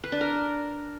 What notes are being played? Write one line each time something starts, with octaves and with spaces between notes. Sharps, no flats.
B4
D4
A#4